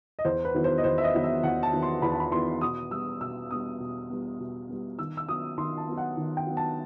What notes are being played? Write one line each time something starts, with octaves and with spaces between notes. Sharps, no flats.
D#5
E2 C5
B4
D#3 F#3 B3 E4
C5
D#5
E2 C5
E5
D#5
D#3 F#3 B3 E4
E5
E2 F#5
A5
D#3 F#3 B3 E4
C6
E2 B5
A5
B5
D#3 F#3 B3 E4 C6
B2 D#6
G3 B3 E6
B2 E6
G3 B3 D#6
B2
G3 B3
B2
G3 B3
D#3 E6
E6
F#3 B3 D#6
D#3 C6
A5
F#3 B3
F#5
D#3
G5
F#3 B3
A5